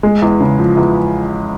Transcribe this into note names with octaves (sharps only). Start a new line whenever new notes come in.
G#3
E2
C#3
F3
E2